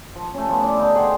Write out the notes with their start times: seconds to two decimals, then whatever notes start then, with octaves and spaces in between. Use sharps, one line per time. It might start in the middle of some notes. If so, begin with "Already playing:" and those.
0.16 F3
0.34 A3 C#4
0.49 F3 B3
0.62 E4 D5
0.77 D3 D#4
0.95 G#4 C5 F#5 G5